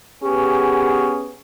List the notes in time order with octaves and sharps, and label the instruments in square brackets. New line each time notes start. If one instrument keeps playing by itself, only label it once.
[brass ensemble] B3 G#4 [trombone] C#4 [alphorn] G4